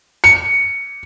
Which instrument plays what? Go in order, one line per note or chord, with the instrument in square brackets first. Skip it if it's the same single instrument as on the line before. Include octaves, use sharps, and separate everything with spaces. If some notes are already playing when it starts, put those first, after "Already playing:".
[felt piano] C#7